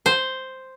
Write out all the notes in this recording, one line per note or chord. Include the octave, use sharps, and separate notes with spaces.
C5